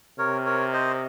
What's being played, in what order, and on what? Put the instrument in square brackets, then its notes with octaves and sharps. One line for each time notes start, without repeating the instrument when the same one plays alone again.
[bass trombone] C3 [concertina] A#4 C#5
[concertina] A#4 C#5
C5 D#5